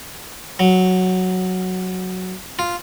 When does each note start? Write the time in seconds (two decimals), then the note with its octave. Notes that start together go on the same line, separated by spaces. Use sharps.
0.59 F#3
2.59 F4